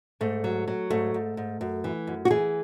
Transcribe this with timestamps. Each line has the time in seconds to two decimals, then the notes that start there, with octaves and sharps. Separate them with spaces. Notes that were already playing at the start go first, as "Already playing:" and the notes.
0.21 G#2 A3
0.44 F#3
0.68 F#3
0.90 G#2 A3
1.14 G#2
1.37 G#2
1.61 F#2
1.84 E3
2.07 F#2
2.25 F#4
2.31 E3 G#4